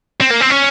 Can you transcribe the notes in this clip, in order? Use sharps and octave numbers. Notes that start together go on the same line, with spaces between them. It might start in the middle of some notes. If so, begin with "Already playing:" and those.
C4
A#3
C4
C#4